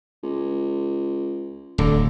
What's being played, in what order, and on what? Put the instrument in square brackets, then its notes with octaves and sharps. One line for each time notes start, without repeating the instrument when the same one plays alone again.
[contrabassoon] C#2
[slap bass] D1 [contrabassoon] D3